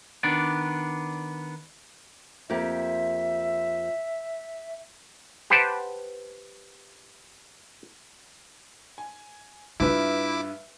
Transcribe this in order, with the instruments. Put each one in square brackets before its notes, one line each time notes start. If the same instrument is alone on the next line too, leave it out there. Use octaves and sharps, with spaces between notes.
[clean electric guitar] D#3 B3 D4 D5
[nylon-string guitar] F2 A#3 G4 [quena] E5
[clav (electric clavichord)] G4 B4 C5 F#5 G5 A5
[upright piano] G#5
[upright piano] G2 B4 E5 [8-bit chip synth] E4 D6 [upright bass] F4